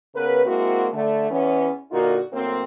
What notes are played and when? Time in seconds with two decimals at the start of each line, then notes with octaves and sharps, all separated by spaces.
0.15 C#3 B3 A#4 B4
0.45 G#3 A#3 C4 E4 F#4
0.94 D3 A3
1.30 E2 E3 B3 C#4
1.91 A#2 D3 A#3 D#4 F4 F#4
2.33 A2 F#3 A#3 C4